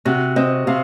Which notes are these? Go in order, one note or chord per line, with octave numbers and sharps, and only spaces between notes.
C3 F#4
C4 D#5
C3 F5